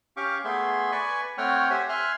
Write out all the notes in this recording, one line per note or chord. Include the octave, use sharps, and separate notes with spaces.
C#4 G4 F5 C#6 D6
A3 B3 G#4 E5 C6
B4 D5 G#5 B5 C#6
A3 C4 C#5 F#5 G5 F6
G4 C5 E5 F#5 G#5
E5 G#5 C6 F6 F#6